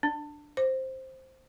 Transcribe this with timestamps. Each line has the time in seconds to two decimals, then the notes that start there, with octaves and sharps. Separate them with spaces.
0.03 D4
0.57 C5